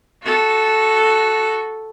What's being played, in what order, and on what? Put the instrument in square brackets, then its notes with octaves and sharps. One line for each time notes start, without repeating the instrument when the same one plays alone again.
[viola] F#4 A4